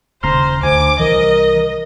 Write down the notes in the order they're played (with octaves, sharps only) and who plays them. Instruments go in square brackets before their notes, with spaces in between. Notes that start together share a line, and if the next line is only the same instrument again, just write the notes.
[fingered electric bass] D#1 C#3 [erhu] C5 [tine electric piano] A#5 C6 F6
[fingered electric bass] D2 [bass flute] C5 [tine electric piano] G#5 [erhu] D6
[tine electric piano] C2 [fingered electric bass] E3 [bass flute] A#4 [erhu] D#5